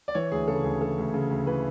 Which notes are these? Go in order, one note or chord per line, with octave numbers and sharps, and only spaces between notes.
D5
E3 C#5
D2 G#4
C#3 A4
D2 G#4
E3 A4
D2
C#3
D2
E3 B4